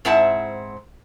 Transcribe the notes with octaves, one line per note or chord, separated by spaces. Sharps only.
G#2 C4 E4 E5 F#5 A5